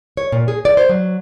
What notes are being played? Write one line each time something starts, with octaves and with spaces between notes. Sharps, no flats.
C#5
A#2
G#4
D5
C5
F#3